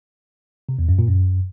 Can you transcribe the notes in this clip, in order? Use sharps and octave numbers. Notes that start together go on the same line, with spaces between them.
C3
E2
F#2
A#2
F#2